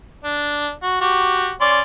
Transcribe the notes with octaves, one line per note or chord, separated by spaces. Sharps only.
D4
F#4
F#4 G4
C#4 D5 C6